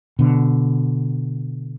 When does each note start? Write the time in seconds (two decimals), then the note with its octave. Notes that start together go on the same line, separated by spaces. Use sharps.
0.19 B2 D3